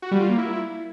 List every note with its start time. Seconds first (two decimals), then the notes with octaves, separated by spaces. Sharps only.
0.02 F#4
0.11 G3
0.20 F4
0.29 A#3
0.38 E4